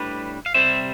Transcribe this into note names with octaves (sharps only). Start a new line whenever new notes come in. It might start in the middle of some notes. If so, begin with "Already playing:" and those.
Already playing: A2 G3 D4 B4
F5
C3 G3 C4 C5 E5